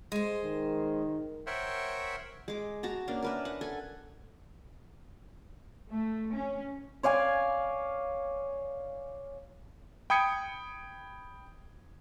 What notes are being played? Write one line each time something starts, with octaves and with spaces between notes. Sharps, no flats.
G#3 C5
D#3
A#4 C5 C#5 E5 F#5 G5
G#3 D6
F#4 A5 A#5
A#3 C#4 D4
A#4 B4 E5
F#5
A4 G#5
A3
C#4
C#5 D5 F5 G#5
G5 B5 D#6 G#6 C#7